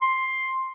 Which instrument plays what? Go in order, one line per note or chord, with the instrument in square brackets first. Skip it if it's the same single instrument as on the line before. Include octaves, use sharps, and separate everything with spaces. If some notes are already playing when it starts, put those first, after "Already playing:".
[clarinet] C6